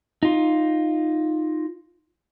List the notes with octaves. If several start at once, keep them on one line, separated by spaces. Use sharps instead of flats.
D#4 F4